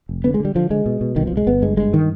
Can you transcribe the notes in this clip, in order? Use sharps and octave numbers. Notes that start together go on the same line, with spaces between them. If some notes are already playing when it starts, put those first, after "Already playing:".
F1
D3 B3
G#3
D3 G3
D3 F3
D3 G#3
B2
B2
C2 D#3
C2 F3
G#3
G1 B3
G2 G#3
G2 G#3
D#3